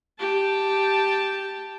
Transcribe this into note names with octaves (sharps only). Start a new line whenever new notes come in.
G4 A5